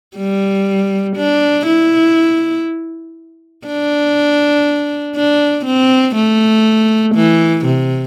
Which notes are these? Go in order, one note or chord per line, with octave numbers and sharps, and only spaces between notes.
G3
D4
E4
D4
D4
C4
A3
E3
C3